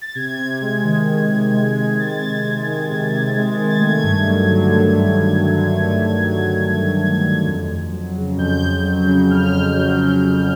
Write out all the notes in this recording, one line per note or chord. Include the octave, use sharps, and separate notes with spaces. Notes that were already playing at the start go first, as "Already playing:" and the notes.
A6
C3 G#6
C3
G#3
D#3
C3
C3
G#3
D#3
C3 A6
C3
G#3
D#3
C3
C3
G#3
D#3
A6
A3 G#6
G2
F#3
D3
A3
G2
F#3
D3
A3
G2
F#3
D3
A3
G2
F#3
D3
F2
F2
F#3
C#3
F2 G6
F2
F#3
C#3
F2 F6
F2
F#3
C#3
F2